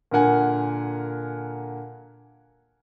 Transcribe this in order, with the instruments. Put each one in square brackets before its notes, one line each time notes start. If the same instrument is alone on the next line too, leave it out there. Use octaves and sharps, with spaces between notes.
[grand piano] A#2 D3 A#4 F#5 G#5